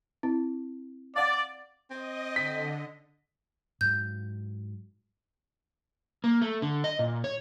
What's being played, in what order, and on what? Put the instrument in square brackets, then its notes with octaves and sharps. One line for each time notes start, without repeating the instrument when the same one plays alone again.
[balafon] C4 E4
[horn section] D5 [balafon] F5 F#5
[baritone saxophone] C4 [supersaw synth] D#5
[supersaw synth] D3 [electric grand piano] B6
[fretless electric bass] G#2 F#3 [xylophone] G6
[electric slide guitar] A#3
A3
D3
D#5
A#2
C#5